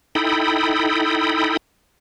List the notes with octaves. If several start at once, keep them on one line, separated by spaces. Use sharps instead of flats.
D#4 E4 A4 G5 B5 D#6